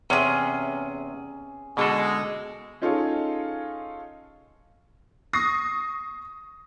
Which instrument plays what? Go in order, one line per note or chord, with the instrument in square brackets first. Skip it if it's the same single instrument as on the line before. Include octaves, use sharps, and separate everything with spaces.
[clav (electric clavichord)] E2 C3 [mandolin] C#4 G#4
[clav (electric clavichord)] B2 D3 A4 [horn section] G#3
[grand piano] C#4 D#4 F4 G#4 A4 C#5
[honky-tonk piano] C#6 D#6 A#6 C7